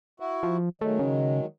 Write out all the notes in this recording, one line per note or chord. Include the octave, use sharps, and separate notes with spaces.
E4 F#4
F3
D#3 F#3 G#3 A3
C#3